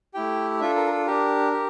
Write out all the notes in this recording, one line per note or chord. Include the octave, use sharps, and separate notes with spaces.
A3 E4 G4 G5
D4 F4 A4 E5
A#4
A#4
A4
D4 G4 A#4
G4